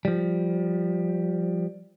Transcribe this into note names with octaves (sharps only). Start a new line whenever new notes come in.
F3 G3